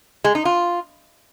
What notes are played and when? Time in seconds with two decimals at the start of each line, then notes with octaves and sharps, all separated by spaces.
0.24 G#3
0.35 D#4
0.45 F4